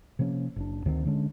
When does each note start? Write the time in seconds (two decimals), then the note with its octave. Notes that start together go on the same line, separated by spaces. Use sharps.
0.19 C3 F3 A#3 C#4
0.56 F#1 D4
0.86 D2 D#3 F#3 C4
1.05 D3 G#3 C#4 D4